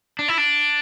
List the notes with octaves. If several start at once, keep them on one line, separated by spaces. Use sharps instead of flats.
D4
E4
D4